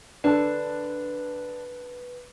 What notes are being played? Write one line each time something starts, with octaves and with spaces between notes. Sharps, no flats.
D3 D4 A4 B4